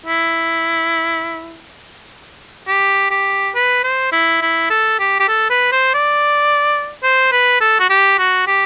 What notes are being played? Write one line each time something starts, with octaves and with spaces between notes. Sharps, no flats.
E4
G4
G4
B4
C5
E4
E4
A4
G4
G4
A4
B4
C5
D5
C5
B4
A4
F#4
G4
F#4
G4